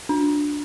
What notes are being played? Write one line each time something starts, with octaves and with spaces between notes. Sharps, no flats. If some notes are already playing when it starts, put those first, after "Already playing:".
D4